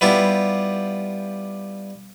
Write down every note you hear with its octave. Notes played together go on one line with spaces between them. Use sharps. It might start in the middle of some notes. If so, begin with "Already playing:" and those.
G3 B3 E4 F4 G4